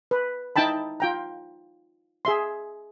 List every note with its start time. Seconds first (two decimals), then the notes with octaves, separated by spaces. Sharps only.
0.11 B4
0.56 D#4 E4 G5 A5 B5
1.00 F4 G5 A#5
2.25 G#4 E5 C6